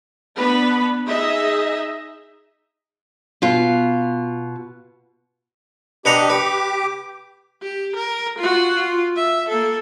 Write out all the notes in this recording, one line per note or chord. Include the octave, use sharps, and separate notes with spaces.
B3 D4 B4 B5
D#4 G#4 D#5 E5
B2 F4
D4 G4 B4 D#5 F#5 A#5
B4 D6
G4
A#4
F4 F#4
F4
E5
A#3 A4